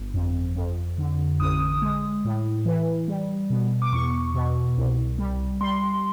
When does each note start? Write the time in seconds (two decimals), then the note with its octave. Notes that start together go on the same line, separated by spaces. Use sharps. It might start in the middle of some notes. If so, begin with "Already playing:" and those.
Already playing: G1
0.14 F2
0.56 F2
0.98 D3
1.40 A1 D#6
1.82 G#3
2.25 A2
2.66 E3
3.08 G3
3.50 B2
3.82 D6
3.92 E2 C#6
4.34 B2
4.77 C2
5.19 G3
5.61 G3 C6